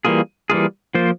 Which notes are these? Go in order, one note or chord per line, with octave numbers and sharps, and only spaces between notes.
E3 G3 A#3 F4 G#4
E3 G3 A#3 F4 G#4
F3 A#3 F4 C5